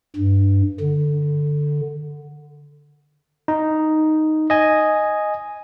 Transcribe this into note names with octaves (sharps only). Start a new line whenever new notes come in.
G2
D3
D#4
D#5 G#5